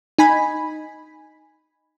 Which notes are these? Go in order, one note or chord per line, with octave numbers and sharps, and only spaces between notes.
D#4 G#5 B5